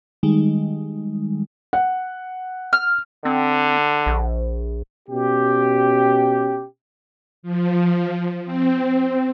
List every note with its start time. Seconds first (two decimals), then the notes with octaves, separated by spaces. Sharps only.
0.23 D#3 G3 G#3 D#4
1.73 F#5
2.73 F6
3.25 D3 C4
4.07 A#1
5.09 B2 C#4 G4
7.43 F3
8.45 C4